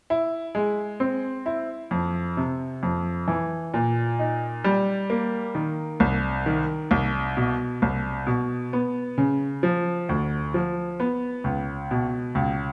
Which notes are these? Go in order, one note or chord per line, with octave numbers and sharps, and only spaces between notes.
E4
G#3
C4
E4
F2
C3
F2
E3
A#2
D#4
G3
A#3
D#3
C2
D#3
C2
B2
C2
B2
B3
C#3
F3
D2
F3
B3
C#2
B2
C#2